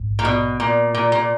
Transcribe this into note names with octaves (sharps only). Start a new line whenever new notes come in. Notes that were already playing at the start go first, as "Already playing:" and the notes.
Already playing: A#1 G#2
A#2
B2
A#2
A#2
A#2